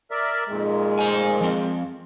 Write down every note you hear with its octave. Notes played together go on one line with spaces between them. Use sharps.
A#4 D5 E5
F2 A#2 D#3 G#3
C5 G#5
F3 C4